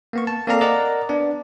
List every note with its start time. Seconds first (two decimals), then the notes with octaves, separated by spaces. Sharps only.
0.13 A#3 B3 C#6
0.27 A5
0.47 A#3 C4 A4 D5 F5 A#5
0.61 A#4 D5 D#5 F#5 A#5
1.09 B3 D4 D5